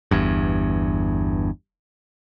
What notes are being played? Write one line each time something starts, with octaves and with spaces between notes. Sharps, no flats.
G1 E2 G2